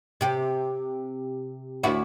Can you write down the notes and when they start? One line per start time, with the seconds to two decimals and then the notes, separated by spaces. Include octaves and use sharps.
0.21 C3 G4
1.83 D2 E4 F#4